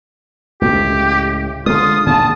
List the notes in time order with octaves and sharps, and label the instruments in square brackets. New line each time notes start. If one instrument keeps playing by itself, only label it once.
[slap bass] C#2 A2 [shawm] G4
[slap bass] D3 G#3 [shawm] F4 [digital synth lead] D#6
[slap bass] A#2 D#3 G#3 [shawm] A5